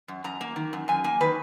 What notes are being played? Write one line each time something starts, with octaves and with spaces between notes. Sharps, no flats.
F#2
F#2 A#5
A#3
D#3
F#2
F#2 G#5
A#3 G#5
D#3 B4